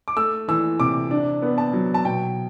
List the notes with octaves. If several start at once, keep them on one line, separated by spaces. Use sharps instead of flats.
D6
A3 E6
E3 E6
C3 D6
D4
B3
A5
F#3
A5
B2 G5